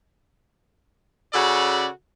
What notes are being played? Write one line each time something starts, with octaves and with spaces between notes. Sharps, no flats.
C#3 C#4 F#4 A4 D5 B5